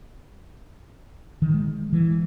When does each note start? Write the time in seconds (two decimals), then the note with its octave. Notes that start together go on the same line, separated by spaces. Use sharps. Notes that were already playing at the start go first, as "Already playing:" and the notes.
1.42 D#3
1.54 G#3
1.93 E3